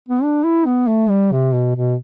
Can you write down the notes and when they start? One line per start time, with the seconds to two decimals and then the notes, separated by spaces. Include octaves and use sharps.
0.09 B3
0.23 D4
0.44 E4
0.66 B3
0.87 A3
1.09 G3
1.32 C3
1.53 B2
1.76 B2